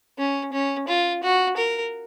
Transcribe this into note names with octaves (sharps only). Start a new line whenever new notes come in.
C#4
C#4
F4
F#4
A#4